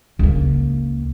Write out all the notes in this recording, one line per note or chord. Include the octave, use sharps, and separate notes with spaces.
C#2 A#3